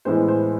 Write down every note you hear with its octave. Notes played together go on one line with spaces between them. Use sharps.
A2 E3 G#3 B3 C5
C5